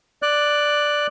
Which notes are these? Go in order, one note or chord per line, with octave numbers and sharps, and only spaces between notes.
D5 F#6